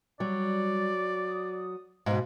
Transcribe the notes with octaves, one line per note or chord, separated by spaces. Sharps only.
F#3 G3 D5
D#6
G#2 B2 F5